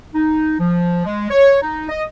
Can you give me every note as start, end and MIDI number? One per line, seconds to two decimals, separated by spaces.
0.15 0.55 63
0.59 1.03 53
1.06 1.29 56
1.30 1.59 73
1.62 1.86 63
1.89 2.03 75